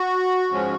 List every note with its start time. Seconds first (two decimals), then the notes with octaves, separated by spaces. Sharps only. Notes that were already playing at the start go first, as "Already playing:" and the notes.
Already playing: F#4
0.50 G#2 F3 G#3 C#4